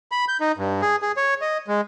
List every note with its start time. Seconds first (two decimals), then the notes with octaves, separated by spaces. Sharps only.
0.12 B5
0.28 G6
0.40 D#4
0.57 G2
0.82 G#4
1.02 G#4
1.17 C#5
1.41 D#5
1.68 G#3